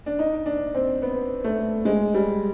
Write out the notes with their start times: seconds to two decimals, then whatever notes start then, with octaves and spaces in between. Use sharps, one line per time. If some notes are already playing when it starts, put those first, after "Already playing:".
0.06 D4
0.19 D#4
0.46 D4
0.75 C4
1.02 B3
1.44 A3
1.85 G#3
2.14 G3